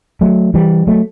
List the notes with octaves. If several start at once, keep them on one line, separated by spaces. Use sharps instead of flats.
F#3 A3
E3 G3
F#3 A3